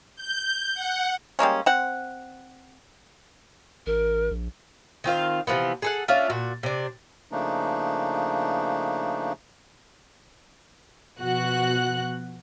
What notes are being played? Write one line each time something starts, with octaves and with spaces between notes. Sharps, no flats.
G6
F#5
G3 G#3 A#3 C#4
C4 F#5
A1 A#4
A#1
D#3 C4 F4 F5
C3 E3 F3 B3
G#4 A4 F#5
C#4 D4 F4 E5
A#2 F#4
C3 D4
C#3 F3 A3 A#3 D4 D#4
B2 F3 F#4 F#6